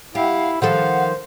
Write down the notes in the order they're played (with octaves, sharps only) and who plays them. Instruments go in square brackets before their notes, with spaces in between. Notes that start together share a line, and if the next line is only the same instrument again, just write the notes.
[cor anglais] E4 [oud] G4 [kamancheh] F5 F#5
[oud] D#3 F3 A4 [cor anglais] C5 [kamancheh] F5 [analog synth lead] F#5